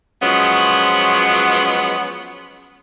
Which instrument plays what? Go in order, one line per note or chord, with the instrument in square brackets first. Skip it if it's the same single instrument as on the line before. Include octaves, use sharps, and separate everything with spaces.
[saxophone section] F3 F#3 G#3 B3 C#4